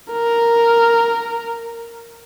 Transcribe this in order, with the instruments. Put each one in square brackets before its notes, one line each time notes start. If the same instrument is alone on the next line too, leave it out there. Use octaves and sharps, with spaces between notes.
[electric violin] A#4